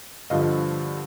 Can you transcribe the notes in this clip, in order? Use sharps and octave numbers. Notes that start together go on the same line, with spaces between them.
G2 D3 F3 D#5 F5